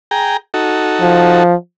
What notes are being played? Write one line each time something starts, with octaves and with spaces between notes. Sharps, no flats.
G#4 G5 A#5
D#4 F#4 A4
F3